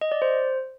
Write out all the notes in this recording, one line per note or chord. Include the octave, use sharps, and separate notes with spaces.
D#5
D5
C5